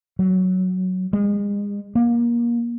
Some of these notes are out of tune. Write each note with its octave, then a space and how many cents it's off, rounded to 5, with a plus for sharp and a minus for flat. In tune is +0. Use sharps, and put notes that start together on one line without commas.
F#3 +5
G#3 -35
A#3 +25